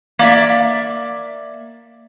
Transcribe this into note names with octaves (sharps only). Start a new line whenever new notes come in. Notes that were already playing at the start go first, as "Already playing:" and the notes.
A#3 D5 E5